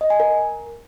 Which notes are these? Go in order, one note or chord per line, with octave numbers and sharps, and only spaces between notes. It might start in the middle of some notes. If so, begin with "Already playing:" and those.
D#5
G#5
A#4